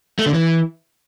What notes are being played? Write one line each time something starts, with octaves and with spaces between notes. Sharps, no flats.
A3
D3
E3